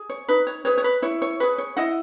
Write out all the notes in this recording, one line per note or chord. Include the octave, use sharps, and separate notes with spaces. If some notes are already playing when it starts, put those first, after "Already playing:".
Already playing: G#4
C#5
D#4 B4
C#5
G#4 B4 C#5
C#5
B4
E4 C#5
C#5
G#4 B4 C#5
C#5
E4 D#5 F#5